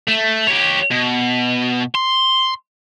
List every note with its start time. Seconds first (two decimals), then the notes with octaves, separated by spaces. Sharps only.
0.07 A3
0.47 G4 C#5
0.91 B2
1.95 C6